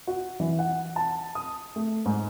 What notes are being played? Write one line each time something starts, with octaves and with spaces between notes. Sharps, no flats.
F#4
E3
F#5
A5
D#6
A3
G#2